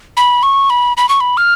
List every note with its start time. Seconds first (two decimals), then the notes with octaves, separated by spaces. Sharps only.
0.17 B5
0.43 C#6
0.70 B5
0.97 B5
1.09 C#6
1.21 B5
1.37 F6